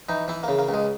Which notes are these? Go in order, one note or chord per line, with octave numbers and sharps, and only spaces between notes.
E3 D#4
E3 E4
C#3 A#3
A#3
C#2
G#3